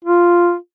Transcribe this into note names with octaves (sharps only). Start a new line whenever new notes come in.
F4